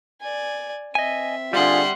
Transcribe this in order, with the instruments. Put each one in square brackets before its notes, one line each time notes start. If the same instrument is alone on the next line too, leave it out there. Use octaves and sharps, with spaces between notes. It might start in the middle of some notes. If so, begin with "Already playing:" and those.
[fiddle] D5 G#5
[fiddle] C4 E5 [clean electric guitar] D#5 G#5
[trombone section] D3 F4 G#4 [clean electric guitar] G3 [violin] F#5 C6